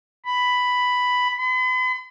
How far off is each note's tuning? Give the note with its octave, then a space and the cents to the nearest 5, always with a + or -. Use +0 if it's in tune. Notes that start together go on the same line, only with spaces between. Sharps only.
B5 +5
B5 +45